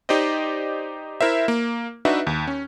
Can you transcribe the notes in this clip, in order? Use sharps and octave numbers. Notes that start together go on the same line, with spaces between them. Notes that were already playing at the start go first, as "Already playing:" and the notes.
D#4 G4 C5 D5 D#5
E4 A#4 C5 E5
A#3
D4 D#4 F#4 B4 E5
D#2
C#4